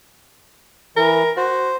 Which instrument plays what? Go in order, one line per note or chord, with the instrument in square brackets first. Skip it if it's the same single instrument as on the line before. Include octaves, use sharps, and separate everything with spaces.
[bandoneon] E3 [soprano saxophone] A#4
[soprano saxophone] F#4 [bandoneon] C5